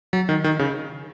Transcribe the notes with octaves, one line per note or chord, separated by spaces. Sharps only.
F#3
D#3
D#3
C#3